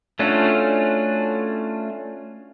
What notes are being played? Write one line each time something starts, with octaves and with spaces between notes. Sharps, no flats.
A3 C#4 D4 F4 F#4